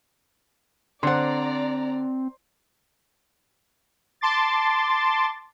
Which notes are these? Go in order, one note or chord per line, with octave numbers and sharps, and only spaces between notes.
D3 C4 C5 D5 F#5 A#5 C6
A5 C6 D6 A6